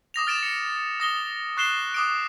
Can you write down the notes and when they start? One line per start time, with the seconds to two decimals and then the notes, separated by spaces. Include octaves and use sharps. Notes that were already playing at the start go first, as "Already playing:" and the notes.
0.14 D6 D#6 A#6 F7
0.27 F6 A6 D7 E7
0.43 C#7
1.00 D#6 A#6 G7
1.57 C#6 F#6 C7 E7 G7
1.94 D6 D#6 D7